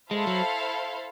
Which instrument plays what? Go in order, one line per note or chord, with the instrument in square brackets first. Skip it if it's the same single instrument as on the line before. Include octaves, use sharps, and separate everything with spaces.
[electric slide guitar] G#3 [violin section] E4 A4 C5 F5
[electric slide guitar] F#3